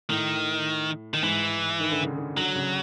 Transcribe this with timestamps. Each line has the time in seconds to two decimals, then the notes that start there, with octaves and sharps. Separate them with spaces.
0.10 A2 D#3
1.14 D#3
1.23 G#2 E3
1.80 D#3
1.92 D3
2.03 C#3
2.15 D3
2.37 D3 F#3
2.55 C#3